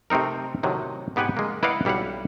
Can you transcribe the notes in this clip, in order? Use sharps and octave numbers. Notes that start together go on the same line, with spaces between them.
C3 A3 C4 D#4 A#4
A2 C3 D#3 F#3
G#2 B3 G4 B4 F#5 G#5
G#3 A#3
E4 B4 D5 D#5 F5 F#5
B1 G3 E4 F5 F#5